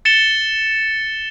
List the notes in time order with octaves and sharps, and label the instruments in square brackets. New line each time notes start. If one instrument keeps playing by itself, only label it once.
[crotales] A6 C#7 E7 G7